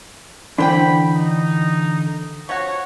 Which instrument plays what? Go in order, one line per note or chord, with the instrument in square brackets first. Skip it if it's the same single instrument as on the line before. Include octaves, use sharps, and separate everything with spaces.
[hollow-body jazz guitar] D3 E3 D4 [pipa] A4 C5 G5 [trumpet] B5
[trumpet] D#4
[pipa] F3 F#4 [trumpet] C#5